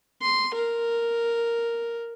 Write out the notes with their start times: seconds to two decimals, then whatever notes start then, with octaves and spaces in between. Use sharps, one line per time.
0.22 C6
0.54 A#4